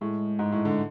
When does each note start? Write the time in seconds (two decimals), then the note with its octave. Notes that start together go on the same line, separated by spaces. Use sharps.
0.01 A2 G#3
0.39 G#2
0.52 A2
0.65 D3